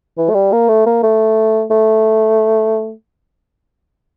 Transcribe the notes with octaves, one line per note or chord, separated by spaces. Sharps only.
E3
A3
G3
A#3
A3
A#3
A3
A3